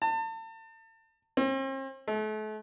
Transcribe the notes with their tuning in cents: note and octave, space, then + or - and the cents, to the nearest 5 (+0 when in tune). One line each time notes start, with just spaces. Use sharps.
A5 +35
C4 +45
A3 -40